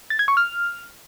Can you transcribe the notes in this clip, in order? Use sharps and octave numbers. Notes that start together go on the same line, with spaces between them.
A6
G#6
C#6
F6